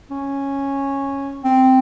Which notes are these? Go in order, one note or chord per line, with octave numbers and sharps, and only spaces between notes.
C#4
C4